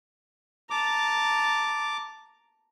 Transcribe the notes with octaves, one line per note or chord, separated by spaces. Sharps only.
A5 A#5 D6